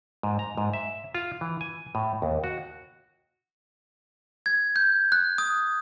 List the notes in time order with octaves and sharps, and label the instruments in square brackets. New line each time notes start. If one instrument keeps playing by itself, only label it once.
[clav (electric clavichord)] G#2
A#5
G#2
E5
F4
E3
G#5
A2
D#2
F#4
[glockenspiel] G#6
G6
F#6
D#6